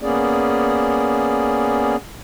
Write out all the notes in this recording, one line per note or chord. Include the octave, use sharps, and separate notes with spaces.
A#3 B3 C#4 G#4 D5